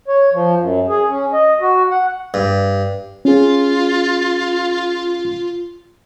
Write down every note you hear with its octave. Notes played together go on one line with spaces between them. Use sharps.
C#5
F3
F#2
G#4
C#4
D#5
F#4
F#5
G2
C#4 F4 G#4